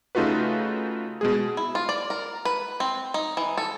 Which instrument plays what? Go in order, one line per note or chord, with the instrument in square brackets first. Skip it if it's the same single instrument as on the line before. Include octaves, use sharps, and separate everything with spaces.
[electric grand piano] C#3 A3 D#4 F4 F#4 B4
B2 G#3 G#4
[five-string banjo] E4
F4
D5
A#4
B4
C4
D#4
E3
A4